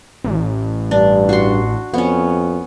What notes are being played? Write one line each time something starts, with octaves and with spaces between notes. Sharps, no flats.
A1
G2 D4
F#4 C6
F2 B3 C#4